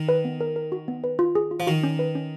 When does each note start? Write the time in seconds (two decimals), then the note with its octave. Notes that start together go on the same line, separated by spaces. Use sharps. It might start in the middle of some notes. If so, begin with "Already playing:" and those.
Already playing: D#3
0.09 B4
0.25 B3
0.41 A#4
0.56 A#4
0.72 F#4
0.88 B3
1.04 B4
1.19 F4
1.35 G#4
1.51 F4
1.60 F3
1.67 D#3 F#4
1.83 C#4
1.99 B4
2.15 C#4